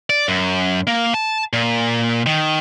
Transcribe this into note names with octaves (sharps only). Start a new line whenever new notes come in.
D5
F#2
A#3
A5
A#2
D#3